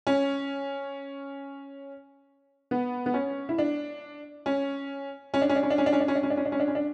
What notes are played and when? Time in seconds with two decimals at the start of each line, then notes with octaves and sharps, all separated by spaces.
0.07 C#4
2.71 B3
3.06 B3
3.14 C#4
3.49 E4
3.58 D4
4.46 C#4
5.34 C#4
5.42 D4
5.49 C#4
5.56 D4
5.63 C#4
5.70 D4
5.78 C#4
5.86 D4
5.93 C#4
6.00 D4
6.08 C#4
6.15 D4
6.23 C#4
6.30 D4
6.37 C#4
6.45 D4
6.52 C#4
6.60 D4
6.68 C#4
6.75 D4